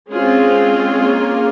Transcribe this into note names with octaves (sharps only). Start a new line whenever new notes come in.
G#3 C4 C#4 F4 G#4
A#3